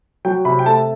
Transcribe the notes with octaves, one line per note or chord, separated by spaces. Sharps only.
F#3 G5
C3 B5
G5
A3 A5